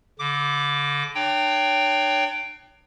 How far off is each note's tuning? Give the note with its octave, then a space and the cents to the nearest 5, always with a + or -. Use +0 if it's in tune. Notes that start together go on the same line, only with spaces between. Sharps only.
D3 -40 D6 +0
D4 +40 C#5 +20 G5 +0